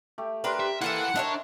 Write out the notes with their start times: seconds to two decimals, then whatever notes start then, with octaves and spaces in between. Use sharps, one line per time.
0.18 A3 G4
0.44 D4 G4 A#4 B4 C6
0.60 C5 E5
0.81 A#3 E4 A4 B4 E5 F#5
1.16 D4 D#4 A#4 C#5 E5 A5